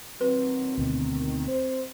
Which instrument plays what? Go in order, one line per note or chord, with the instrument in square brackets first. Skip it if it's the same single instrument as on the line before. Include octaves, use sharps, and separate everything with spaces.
[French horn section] A#2 D#3 F#3 [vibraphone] C4 [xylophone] B4
[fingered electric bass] D2 B2 [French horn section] D#3
[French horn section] C5